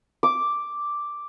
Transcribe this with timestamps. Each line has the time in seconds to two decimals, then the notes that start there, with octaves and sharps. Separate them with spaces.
0.23 D6